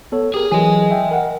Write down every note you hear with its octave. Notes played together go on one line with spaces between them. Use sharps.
B3 A4 C#5
G4 G#4 A#4
E3 F#3 G#4 D#5 G#5
E5 G5
A#4 F#5